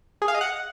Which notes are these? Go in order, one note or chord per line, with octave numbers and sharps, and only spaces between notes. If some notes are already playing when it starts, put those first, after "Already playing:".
G#4
F5
D#5
F#5